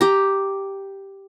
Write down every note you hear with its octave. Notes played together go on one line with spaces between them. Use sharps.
G4 A#5